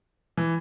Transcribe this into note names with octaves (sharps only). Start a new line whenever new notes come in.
E3